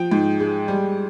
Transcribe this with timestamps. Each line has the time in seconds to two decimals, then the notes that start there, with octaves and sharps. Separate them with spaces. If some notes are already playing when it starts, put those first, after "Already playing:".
Already playing: F3 G5
0.11 G#2
0.40 G#3
0.68 G3